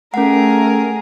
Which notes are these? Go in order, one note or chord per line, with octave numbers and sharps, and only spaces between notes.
A3 C#4 G#4 A#4 F#5